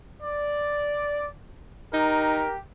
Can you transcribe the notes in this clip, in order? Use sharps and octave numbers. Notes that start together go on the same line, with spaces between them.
D5
D#4 G4 A#4